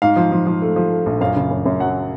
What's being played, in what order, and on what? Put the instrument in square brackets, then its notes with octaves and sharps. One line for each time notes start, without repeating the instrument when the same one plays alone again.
[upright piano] G#2 F5
F3
F3
F3
A3
F3
A3
A#1
F#2 F5
C#3
F#2
F#2
F#3 F#5